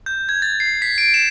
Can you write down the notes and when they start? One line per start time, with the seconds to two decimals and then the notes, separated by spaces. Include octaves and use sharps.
0.06 G6
0.29 G#6
0.42 A6
0.60 C7
0.82 B6
0.98 D7
1.14 E7